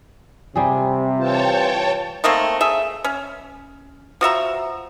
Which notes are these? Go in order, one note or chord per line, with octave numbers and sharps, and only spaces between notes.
C3 G3 G#4
E3 F4 C5 C#5 G5 A5
D#3 A3 A#3 C4
G#4 E5
C#4
F3 F#4 E5 A#5